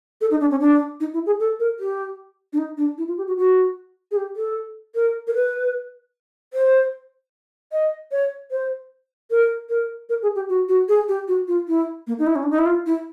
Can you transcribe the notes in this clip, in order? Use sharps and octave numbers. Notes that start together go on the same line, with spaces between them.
A4
D#4
D4
C#4
D4
D#4
E4
G#4
A4
A#4
G4
D4
D#4
D4
E4
F4
G4
F#4
F#4
G#4
G4
A4
A#4
A#4
B4
C5
D#5
C#5
C5
A#4
A#4
A#4
G#4
G4
F#4
F#4
G#4
G4
F#4
F4
E4
A#3
D#4
E4
C#4
D4
D#4
E4
F4
E4